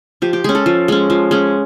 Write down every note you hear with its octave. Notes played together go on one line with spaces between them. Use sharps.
F3 G4
G4
G#3 C#4 G#4
A4
F3
G#3 C#4
F3
G#3 C#4